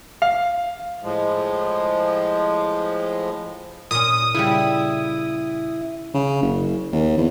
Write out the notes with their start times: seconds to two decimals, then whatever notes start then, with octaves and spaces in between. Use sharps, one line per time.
0.22 F5
1.03 A2 F3 G#3
3.91 A#2 C#4 D#6
4.34 C#3 G3 E4
6.14 C#3
6.42 F#1
6.92 D#2
7.17 E2